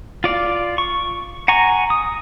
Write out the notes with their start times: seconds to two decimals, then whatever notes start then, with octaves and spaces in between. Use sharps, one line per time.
0.24 F4 D5 F5
0.78 C#6
1.48 F#5 G#5 A#5 C#6
1.90 D#6